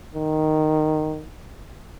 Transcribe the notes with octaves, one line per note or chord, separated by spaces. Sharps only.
D#3